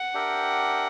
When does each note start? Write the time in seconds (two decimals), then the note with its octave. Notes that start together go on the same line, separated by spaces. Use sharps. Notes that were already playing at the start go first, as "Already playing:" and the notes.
Already playing: F#5
0.14 D4 G4 A#4 E5 G5